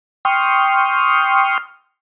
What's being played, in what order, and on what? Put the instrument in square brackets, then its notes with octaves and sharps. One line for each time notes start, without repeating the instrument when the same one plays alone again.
[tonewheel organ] G5 C6 C#6 D#6 F6